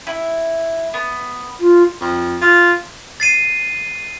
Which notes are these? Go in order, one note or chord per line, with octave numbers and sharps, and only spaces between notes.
E4
B3
F4
F2
F4
A6 C7 D#7